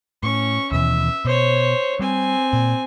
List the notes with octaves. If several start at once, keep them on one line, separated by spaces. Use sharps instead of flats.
A2 C#4 C#6
D#2 B2 E3 E5
B2 C5 C#5
G3 C4 G#5
A#2